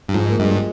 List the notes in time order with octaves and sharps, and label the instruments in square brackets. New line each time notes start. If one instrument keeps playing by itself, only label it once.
[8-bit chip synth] G2
[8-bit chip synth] G#2 [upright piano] F3
[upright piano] A#3
[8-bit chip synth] G2 [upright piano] G#3